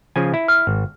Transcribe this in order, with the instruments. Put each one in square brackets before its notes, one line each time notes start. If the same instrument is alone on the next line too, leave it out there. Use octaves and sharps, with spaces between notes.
[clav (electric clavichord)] C#3 F3 G#5
E4
[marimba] F6
[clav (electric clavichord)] G#1